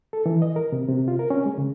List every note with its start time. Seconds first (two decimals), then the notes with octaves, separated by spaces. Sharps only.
0.13 A4
0.26 E3
0.42 D#5
0.56 A#4
0.72 C3
0.88 C3
1.08 F4
1.19 A#4
1.30 C#4
1.46 G#3
1.58 C#3